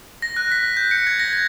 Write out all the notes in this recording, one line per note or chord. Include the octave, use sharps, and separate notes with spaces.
A#6
F#6
B6
G6
C#7
G#6
A#6
G#6